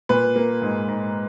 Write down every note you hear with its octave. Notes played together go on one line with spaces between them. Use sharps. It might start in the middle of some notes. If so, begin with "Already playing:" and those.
A#2 B4
A#3
G#2
G#2